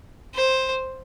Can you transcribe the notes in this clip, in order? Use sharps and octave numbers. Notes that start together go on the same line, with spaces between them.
C5